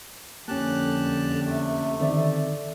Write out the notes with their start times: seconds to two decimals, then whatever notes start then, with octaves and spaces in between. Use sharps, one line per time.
0.48 F2 D3 A#3 C#4 G4 A5 F#6
1.46 C3 A3
2.00 D3 D#3 C4 A4 D5 E5